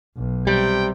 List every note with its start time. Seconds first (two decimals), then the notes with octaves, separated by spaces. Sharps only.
0.17 B1
0.47 C3 G3 G5